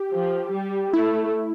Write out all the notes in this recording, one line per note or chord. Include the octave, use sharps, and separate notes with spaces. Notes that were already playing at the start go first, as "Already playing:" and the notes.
Already playing: G4
F3
G3
A3 E4